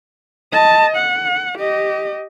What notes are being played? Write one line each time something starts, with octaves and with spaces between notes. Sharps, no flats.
D#5 A5
F#5
G4 D#5